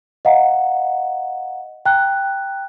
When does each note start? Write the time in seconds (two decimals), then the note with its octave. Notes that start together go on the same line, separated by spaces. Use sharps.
0.25 D#5 F5 F#5 A#5
1.86 G5 A#5 F#6